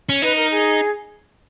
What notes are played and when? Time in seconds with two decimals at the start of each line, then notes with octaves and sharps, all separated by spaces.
0.09 C#4
0.22 D#4 B4
0.37 A#4
0.51 G#4